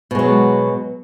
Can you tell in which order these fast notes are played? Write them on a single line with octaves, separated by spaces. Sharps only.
B2 G#3 F#3